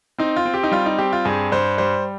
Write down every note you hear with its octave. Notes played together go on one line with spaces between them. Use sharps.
C4 D#4
F4
C4
G4
D#4
G3 F4
D#4
C4 G4
F4
G2 G#4
G2 C5
G3 C5